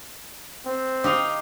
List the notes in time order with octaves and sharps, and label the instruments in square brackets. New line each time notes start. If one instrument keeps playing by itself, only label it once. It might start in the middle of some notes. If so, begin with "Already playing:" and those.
[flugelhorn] C4
[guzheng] D#4 G4 F5